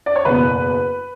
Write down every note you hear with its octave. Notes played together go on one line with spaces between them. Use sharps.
D5
C#5
F#1 E2 B2 B4